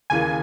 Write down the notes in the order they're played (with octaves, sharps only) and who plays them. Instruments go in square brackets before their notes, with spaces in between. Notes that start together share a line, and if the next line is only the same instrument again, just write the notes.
[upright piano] D#2 C#3 E3 A#3 [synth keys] G#5